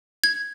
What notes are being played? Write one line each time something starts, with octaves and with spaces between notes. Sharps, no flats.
G#6